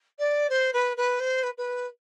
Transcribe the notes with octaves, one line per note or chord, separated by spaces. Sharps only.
D5
C5
B4
B4
C5
B4
B4